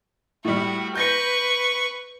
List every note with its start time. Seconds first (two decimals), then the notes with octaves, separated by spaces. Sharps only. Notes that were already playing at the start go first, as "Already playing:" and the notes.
0.45 A2 G3 F#4
0.95 B4 C#6 G6 A#6